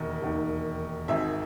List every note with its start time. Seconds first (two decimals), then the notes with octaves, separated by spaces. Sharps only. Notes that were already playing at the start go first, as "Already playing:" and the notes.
Already playing: E1 D#2 D#3
0.22 E1 D#2 D#3
1.08 G#1 G#2 D#3 E5